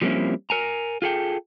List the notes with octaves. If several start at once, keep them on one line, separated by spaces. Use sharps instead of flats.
F3 G3 A#3 C4 C#4 E4
A#4 G#5 A#5
F4 G#4 A4 G5